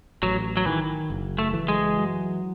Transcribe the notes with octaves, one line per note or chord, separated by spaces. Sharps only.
A1 F#3
F#3
D#3 E3
F#1
A3
E3
G#3
F#3